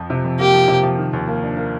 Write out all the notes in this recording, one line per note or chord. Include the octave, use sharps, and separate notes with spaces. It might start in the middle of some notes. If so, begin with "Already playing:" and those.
Already playing: F2 F3
C3
F2
A#3 G4
F3
C3
F3
D#3
D#2
A#3
D4
A#3